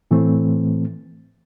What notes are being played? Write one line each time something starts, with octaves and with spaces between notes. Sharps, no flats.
A2 E3 A3 C4